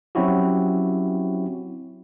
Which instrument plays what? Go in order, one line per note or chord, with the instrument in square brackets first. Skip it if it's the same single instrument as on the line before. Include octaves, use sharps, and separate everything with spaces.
[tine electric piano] F#3 C4 C#4 E4 F#4 G4